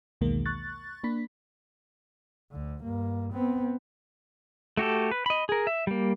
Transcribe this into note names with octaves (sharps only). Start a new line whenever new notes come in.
B1 E2 B2 D#3 G#3 A#3
C#6 F#6 A6
A#3 D4 B5 B6
D2 D3
G2 A#3
B3 C4
A3 F#4 G4 A4
B4
D#5 B5
G#4 A#4
E5
G3 A#3